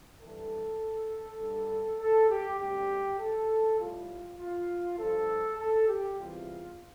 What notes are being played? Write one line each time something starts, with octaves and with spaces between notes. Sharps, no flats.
G2 E3 G3 A4
G2 D3 G3
A4
G4
D2 C3 G3 G4
A4
A2 G3 F4
F4
G2 F3 A4
A4
G4
E2 C3 E3 G3 F4